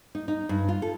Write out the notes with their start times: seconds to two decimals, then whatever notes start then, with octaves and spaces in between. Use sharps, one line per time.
0.15 D#4
0.28 D#4
0.49 G2
0.69 F4
0.82 A4